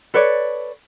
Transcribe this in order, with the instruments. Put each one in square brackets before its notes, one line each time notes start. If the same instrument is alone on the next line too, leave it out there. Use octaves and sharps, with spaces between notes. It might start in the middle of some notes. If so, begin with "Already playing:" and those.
[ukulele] A4 B4 C#5 D5